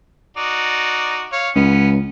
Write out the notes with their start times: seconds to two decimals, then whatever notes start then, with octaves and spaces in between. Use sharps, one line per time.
0.37 D#4 F#4 D5
1.32 C#5 F5
1.56 C#2 B3 C#4